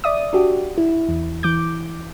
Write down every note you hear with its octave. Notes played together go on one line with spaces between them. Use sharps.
D5 E5 D#6
D4 F#4 G4
E4
E2
E3 D6 G6